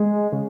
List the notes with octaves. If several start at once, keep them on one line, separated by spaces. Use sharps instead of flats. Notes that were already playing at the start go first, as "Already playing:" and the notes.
Already playing: G#3
C#3